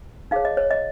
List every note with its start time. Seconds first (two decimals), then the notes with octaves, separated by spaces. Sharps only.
0.31 D#4 G#4 C#5 F5
0.45 D#5
0.57 C#5
0.71 D#5